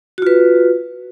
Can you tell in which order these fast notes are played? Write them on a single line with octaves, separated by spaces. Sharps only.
F#4 F4 B4